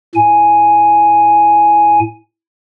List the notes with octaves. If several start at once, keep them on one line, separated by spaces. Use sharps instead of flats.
A2 G#5